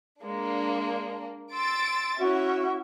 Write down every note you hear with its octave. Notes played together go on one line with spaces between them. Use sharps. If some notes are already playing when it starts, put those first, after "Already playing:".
G#3 A#3 D4
C6 E6 A6 D7
C#4 E4 F#4 E5